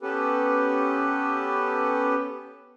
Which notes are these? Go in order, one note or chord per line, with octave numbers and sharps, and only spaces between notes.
B3 C#4 G4 A4 B4